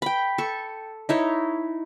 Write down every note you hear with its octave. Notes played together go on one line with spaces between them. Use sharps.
G5 B5
A4 C#6
D#4 E4 C#5